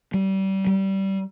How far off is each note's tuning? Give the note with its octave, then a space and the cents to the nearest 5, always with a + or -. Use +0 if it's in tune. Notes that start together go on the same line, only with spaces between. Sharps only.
G3 -30
G3 -20